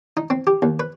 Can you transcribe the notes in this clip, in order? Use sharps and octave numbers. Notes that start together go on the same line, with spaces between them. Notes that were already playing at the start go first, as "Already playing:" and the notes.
D#4
C4
G4
D#2
B4